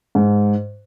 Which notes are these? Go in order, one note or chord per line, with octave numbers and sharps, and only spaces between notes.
G#2